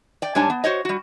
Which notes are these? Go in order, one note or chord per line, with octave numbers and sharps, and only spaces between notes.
D5 G5
G#2 G3 D4 C#5 G#5 A5
B3
F#4 C5 C#5 D#5
G3 F#4